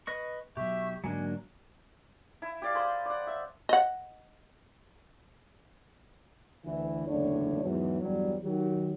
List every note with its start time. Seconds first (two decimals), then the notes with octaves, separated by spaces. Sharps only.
0.07 B4 D#5 C#6
0.57 B2 F#3 G4 E5 C#6
1.04 G#2 D3 F#3 A#3 D4 G#5
2.42 E4
2.62 G4 D5 F5
2.75 G#4 C5 B5 C6
3.06 D5 F#5
3.27 E5
3.69 D#5 F#5
6.65 D2 E3
7.07 F#1 E2 A2 D3 D4 C#5
7.63 E2 G#2 E3 F#3
8.02 E2 G2 F#3 G3
8.43 D#3 F#3 G4